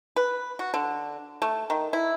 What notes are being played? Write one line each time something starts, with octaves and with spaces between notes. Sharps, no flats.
B4
F#4
D3
A3
D#3
E4